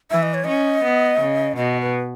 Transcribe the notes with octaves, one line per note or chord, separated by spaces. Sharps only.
E3 E5
D#5
C#5
C#4 D#5
B3
C#3
B2 D#5
B4